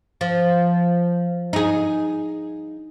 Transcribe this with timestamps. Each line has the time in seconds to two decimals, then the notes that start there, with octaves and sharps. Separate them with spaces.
0.21 F3
1.53 D#4 G#4